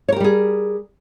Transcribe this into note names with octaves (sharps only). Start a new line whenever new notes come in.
G3 G4 G#4 A#4 C#5